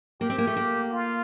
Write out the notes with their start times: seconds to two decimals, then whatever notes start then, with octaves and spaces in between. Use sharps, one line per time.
0.21 A#3 G4
0.30 C4
0.38 A#3
0.47 A3
0.56 A#3
0.92 F4